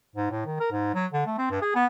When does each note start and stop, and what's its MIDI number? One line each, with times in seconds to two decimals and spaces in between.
0.16 0.29 44
0.31 0.44 45
0.46 0.59 51
0.60 0.68 70
0.72 0.93 44
0.94 1.06 54
1.13 1.24 50
1.26 1.34 57
1.38 1.48 60
1.50 1.58 43
1.61 1.74 68
1.75 1.86 59